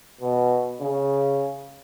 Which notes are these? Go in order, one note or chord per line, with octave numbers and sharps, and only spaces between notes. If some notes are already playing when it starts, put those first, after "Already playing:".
B2
C#3